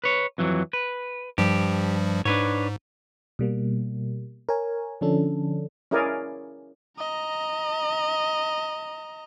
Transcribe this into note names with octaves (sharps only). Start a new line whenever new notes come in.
B4 C#5
F2 E3 F#3
B4
G2 F3 G3 G4
G#2 D4 B4 C#5
B2 G3 A#3
A#4 C#5 G#5
D3 F3 C#4 D4 A4
C#4 E4 G#4 A#4 D5 G#5
D#5 A#5